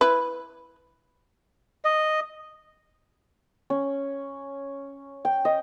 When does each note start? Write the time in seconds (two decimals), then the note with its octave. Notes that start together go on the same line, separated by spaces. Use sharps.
0.01 E4 B4
1.85 D#5
3.70 C#4
5.25 G5
5.45 D#5